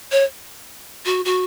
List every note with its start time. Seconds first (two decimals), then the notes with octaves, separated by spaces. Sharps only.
0.12 C#5
1.05 F#4
1.25 F#4